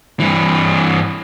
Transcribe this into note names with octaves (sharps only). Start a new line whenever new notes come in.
G2 E3